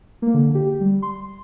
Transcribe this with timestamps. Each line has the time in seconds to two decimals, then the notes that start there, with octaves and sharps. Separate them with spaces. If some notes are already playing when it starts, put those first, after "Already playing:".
0.22 A#3
0.34 D3
0.55 G4
0.80 G3
1.02 C6